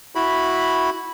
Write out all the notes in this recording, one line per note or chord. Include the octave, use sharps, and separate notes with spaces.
E4 F#4 B5